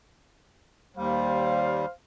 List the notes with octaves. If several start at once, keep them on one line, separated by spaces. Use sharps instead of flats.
D#2 G3 C5 F5